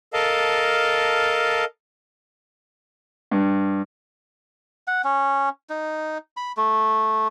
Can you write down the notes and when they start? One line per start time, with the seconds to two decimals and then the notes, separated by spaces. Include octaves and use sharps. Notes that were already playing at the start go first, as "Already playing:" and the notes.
0.13 A4 A#4 D#5 F5 A5
3.31 G2
4.87 F#5
5.04 C#4
5.70 D#4
6.37 B5
6.57 A3